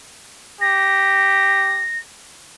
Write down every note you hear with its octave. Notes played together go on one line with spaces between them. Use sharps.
G4 A#6